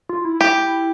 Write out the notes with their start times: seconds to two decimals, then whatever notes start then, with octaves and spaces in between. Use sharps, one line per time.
0.09 F4
0.25 E4
0.41 E4 G4